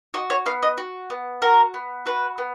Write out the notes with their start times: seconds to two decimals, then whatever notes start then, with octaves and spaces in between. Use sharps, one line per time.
0.14 F#4 D#5
0.30 C#5
0.46 B3 F5
0.63 D#5
0.78 F#4
1.10 B3
1.42 F#4 A#4
1.74 B3
2.06 F#4 B4
2.38 B3